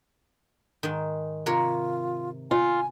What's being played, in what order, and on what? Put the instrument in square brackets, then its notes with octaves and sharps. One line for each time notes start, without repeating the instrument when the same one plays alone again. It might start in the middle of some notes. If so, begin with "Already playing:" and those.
[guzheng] G#2 D#3
[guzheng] C3 A#4 C#5 [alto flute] F4
[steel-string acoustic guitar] F4 [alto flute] G#5